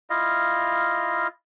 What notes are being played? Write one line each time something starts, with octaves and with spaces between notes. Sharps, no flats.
E4 F4 D#5 F5